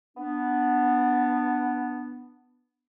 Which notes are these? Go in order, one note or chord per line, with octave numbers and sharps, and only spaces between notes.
B3 D4